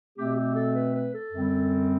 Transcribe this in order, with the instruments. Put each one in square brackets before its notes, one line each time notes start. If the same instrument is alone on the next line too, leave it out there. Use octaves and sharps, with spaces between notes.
[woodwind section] B2 A3 C4 G4
G4
A4
B4
B4
A4
F#2 D3 G3 C4